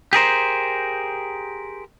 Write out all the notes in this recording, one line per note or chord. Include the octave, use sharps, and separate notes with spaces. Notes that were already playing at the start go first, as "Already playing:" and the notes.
G4 G#4 A#4 C5